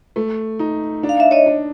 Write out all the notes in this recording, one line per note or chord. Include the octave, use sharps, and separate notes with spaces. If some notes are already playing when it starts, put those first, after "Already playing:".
A3
D#4
D4
F5
E5
C#5 D#5
D4